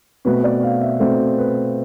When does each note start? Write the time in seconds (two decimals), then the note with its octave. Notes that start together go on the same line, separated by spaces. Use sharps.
0.25 B2 A3 C4 B4
0.44 D5
0.63 F5
0.81 E5
1.00 B2 A3 C4 A4
1.38 B4